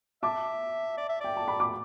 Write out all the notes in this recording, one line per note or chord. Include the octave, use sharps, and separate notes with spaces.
E5 A5 D6
D5
E5
D5 G5
A5
B5
D6